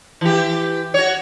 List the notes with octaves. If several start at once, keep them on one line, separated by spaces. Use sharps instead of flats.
E3 G4
F#4 C#5